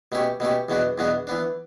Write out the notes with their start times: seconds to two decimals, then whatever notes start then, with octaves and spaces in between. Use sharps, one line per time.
0.12 B2 A3 C#4 G4
0.40 B2 A3 C#4 G4
0.69 E2 B2 F#3 B3 D4
0.98 E2 B2 F#3 B3 D4
1.27 E3 B3 D4